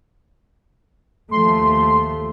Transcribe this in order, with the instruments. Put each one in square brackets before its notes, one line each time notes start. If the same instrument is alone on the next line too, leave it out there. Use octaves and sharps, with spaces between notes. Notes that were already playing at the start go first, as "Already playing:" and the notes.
[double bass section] D#2 F3 A3 [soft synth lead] C6